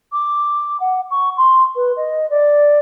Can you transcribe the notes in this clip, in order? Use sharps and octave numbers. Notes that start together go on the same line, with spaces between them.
D6
F#5
C#6
C6
B4
D#5
D5